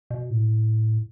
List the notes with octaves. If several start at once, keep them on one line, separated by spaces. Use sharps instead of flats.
B2
A2